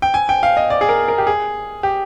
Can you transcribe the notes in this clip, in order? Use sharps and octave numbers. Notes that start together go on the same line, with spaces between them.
G5
G#5
G5
F5
D#5
D5
G#4
A#4
A#4
G4
G#4
G4